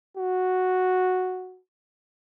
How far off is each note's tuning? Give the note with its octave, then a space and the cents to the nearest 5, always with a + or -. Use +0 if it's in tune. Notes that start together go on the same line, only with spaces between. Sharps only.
F#4 -5